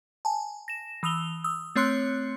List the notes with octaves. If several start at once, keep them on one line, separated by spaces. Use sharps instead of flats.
G#5 A5
A#6 E7
E3 D#6 E6 F7 G7
D#6 E6
A3 C4 C#5 C6 F#6 C#7